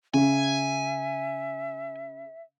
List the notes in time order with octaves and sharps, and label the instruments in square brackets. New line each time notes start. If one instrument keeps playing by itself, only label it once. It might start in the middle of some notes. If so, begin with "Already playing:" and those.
[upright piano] C#3 [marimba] C#4 [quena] E5 [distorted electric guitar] G#5